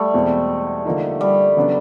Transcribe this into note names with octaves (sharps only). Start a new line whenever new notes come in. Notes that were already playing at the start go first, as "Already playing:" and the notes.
Already playing: G3 A3
E2 B2 G#3 C4
D3 F3 A#3 D#4
G3
C#3 F#3 B3 D4